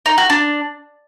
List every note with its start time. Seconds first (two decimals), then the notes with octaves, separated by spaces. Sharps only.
0.06 D#4
0.18 F#4
0.30 D4